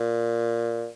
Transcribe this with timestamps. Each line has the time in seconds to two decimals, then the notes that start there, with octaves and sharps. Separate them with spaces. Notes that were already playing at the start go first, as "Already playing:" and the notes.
Already playing: A#2